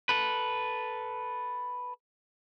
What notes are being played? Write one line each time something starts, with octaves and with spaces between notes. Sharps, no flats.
A4 B4